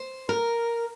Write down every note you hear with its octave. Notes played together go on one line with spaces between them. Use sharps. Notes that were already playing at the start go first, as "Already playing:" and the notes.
Already playing: C5
A#4